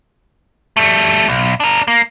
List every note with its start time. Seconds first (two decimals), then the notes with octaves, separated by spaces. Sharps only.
0.77 G3 A3
1.28 B1
1.60 D4 A#4
1.88 A#3